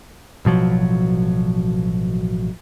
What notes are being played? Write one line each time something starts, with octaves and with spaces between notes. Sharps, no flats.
A1 B2 F3 F#3